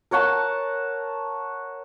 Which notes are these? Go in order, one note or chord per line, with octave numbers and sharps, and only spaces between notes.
A#4 C#5 F#5 A5